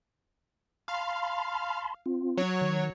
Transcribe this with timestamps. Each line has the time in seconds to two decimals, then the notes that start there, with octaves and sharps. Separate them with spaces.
0.88 F5 A5 B5 C6
2.06 C4 F4
2.37 F#3 C#5
2.62 D#3